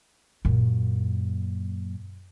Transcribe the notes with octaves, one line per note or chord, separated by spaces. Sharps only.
F#2 A#2